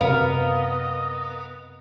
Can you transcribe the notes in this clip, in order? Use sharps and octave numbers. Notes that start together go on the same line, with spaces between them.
F#2 C3 B3 A#4 D#5 F5